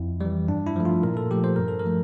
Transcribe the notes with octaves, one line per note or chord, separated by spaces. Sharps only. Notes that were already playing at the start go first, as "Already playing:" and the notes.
Already playing: F2 E4
E3 G3
G2 D4
E4
F3 A3
F4
A#2 A#4
A4
F3 A3 G4
C5
G2 A#4
A4
A#4
F3 A3